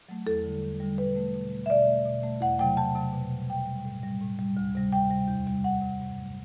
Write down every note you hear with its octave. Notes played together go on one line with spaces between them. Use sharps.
F#3 A3
E2 A4
D3 G3
E2
D3 G3
B2 B4
A3
B2
A3
E5
B2 D5
A3
B2
A3
E2 F#5
C3 F#3 A3 G5
E2 A5
C3 F#3 A3
B2
G3
B2 G5
G3
A2
G3
A2
G3
D2
C3 G3
D2 G5
C3 G3
E2
C3 G3
E2 F#5
C3 G3
G2
F#3 A3